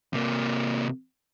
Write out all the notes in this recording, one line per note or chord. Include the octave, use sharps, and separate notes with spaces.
C3 A#3